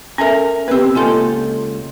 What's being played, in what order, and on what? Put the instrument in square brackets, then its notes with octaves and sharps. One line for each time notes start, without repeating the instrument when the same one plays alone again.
[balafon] C#4 A4 E5 [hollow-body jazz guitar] A#4 G#5
[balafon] B3 G4 [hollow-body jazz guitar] C4 B4
[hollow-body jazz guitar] C#2 F4 A4 [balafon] A#3 G#5